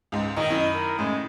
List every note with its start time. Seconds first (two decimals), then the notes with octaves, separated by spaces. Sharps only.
0.12 C#2 G#2
0.37 A#1 D#3 D#5
0.50 F#2 E4 D5 D#5
0.74 A#4
0.99 A2 C#3 G#3